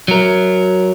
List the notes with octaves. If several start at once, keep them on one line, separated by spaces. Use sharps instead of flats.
F#3 A#4